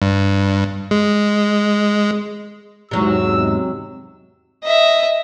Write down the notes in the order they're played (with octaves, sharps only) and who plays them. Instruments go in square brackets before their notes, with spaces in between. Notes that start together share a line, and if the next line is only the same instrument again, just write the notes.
[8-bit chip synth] G2
G#3
[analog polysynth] E2 G#2 [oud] C3 F#3 [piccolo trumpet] E6
[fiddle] D#5 E5